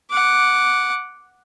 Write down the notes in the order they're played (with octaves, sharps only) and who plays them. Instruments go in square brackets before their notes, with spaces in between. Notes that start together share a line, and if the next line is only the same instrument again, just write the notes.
[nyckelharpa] F#5 D6